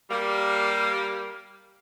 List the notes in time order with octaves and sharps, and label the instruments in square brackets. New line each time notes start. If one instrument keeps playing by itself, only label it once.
[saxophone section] G3 A#3